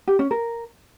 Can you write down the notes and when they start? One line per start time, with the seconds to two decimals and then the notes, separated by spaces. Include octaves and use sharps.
0.08 G4
0.19 C#4
0.31 A#4